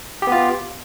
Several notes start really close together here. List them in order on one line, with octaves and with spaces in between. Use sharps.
G4 B3 F4